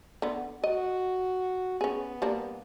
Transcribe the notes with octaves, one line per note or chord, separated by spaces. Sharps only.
D3 B3
F#4 D#5
B3 C#4 G#4
G3 A#3 D4